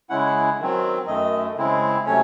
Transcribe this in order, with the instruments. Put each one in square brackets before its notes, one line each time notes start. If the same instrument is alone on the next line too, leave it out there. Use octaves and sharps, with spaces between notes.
[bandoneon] C#3 G#3 C#4 E4 F#5
D#3 F#3 C4
F#2 D#3 A3 D#5
C#3 G#3 C4 E4
C3 F#3 A3 C#4 C#5